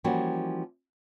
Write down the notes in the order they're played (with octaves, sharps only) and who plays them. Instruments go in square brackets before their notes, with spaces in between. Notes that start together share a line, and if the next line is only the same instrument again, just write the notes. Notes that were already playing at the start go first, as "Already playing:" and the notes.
[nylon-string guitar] E3 F3 G3 A#3 C#4 F#4